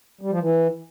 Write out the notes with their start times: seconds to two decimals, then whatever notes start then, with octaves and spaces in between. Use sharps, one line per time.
0.21 G3
0.31 F3
0.41 E3